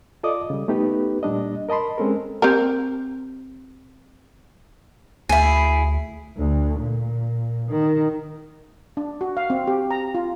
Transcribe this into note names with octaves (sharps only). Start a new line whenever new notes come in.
F4 A4 D5 D#5 D6 D#6
C#3 G3
A3 B3 D#4 G4 B4
A#2 G3 D4 D#5
A#4 D#5 A5 B5 C6
G#3 C4 C#4 A4 A#4
C4 G4 A#4
D2 E4 G#4
D2
A#2
D#3
D4
F#4
F5
C4
G4
A#5
F4